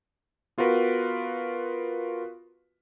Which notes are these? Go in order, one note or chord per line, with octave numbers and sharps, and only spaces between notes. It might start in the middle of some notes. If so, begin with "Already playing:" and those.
B3 F4 F#4 A#4 B4